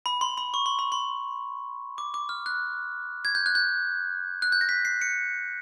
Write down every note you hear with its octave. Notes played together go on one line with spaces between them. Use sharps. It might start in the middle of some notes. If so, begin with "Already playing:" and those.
B5
C6
B5
C#6
C6
B5
C6
D6
D6
F6
F#6
G#6
G6
F#6
G6
F#6
G6
A#6
B6
C7
C#7